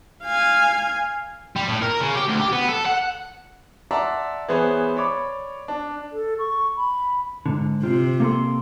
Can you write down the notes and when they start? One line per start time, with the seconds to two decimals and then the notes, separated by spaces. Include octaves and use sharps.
0.24 F5 G#5
1.56 G3
1.68 A2
1.82 A#4
2.00 C#3
2.16 G4
2.28 D2
2.40 G4
2.53 B3
2.69 A4
2.86 F#5
3.91 D5 E5 F#5 A5 A#5 C6
4.48 E3 B3 G#4 C5 C#5
4.97 C#5 D5 B5 C#6 D6
5.68 D4
6.13 A4
6.39 C#6
6.77 B5
7.46 G#2 D3
7.83 C3 F4 G4 C5
8.20 A#3 A4 C6